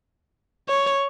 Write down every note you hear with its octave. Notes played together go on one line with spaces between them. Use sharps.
C#5